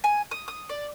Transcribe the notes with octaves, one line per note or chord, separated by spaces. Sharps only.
G#5
D#6
D#6
D5